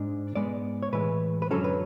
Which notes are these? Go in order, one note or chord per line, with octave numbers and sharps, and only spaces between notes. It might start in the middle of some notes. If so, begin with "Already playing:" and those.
Already playing: G#2 G#3 D4
G#2 G#3 B3 D5
C#5
A2 E3 G#3 B4
B4
F#2 D3 F#3 C#4 A4
B4